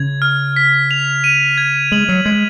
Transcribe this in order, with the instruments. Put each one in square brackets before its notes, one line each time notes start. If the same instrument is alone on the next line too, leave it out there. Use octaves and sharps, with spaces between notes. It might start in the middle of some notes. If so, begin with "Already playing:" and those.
Already playing: [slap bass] C#3 [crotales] G#6
[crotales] F6
B6
F7
D#7
G#6
[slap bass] G#3 [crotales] F#7
[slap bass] F#3
[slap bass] G#3 [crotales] G#6